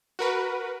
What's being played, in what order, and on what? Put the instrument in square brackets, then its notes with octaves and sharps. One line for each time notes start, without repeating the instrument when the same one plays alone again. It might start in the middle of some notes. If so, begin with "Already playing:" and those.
[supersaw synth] F#4 A#4 B4